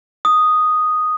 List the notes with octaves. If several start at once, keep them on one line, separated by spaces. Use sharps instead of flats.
D#6